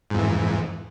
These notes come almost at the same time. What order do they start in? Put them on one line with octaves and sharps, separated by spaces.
G#2 F2 E3